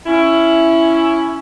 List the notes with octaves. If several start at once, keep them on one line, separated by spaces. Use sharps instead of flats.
C#4 E4